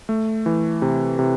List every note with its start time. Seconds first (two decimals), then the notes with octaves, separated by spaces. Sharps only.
0.09 A3
0.46 E3
0.82 C3
1.19 C3